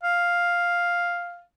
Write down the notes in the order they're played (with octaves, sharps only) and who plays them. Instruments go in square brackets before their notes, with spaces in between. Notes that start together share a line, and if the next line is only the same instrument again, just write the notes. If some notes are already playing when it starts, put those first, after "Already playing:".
[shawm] F5